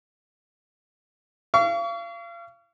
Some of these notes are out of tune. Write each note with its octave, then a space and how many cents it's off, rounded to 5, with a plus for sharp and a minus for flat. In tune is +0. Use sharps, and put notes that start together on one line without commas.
F5 -35 C#6 +40